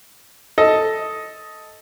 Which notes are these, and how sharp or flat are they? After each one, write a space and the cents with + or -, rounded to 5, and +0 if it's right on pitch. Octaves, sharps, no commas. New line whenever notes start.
A4 +0 D#5 +10